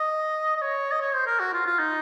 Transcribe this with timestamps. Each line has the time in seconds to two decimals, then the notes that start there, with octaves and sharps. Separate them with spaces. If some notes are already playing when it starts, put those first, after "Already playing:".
Already playing: D#5
0.57 D#5
0.62 C#5
0.92 D#5
1.01 C#5
1.15 C5
1.27 A#4
1.40 F#4
1.54 F4
1.67 F4
1.79 D#4